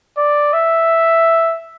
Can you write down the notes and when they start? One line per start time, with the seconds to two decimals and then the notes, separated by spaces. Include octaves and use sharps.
0.18 D5
0.53 E5